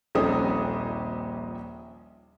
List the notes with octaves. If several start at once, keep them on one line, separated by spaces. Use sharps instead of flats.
D#1 A#1 C4 C#4 D#4 D#6